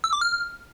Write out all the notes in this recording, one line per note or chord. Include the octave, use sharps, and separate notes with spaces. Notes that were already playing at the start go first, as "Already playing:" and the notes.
E6
D6
F6